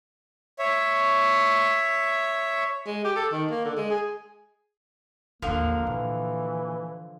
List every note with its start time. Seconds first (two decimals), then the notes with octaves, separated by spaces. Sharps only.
0.59 C#5 E5
2.86 G#3
3.04 G4
3.16 A4
3.32 D#3
3.51 A#3
3.65 D3
3.77 G#3
3.90 G#4
5.42 A1 D#2 D3 F3 A#3
5.85 A#2 E3 A#3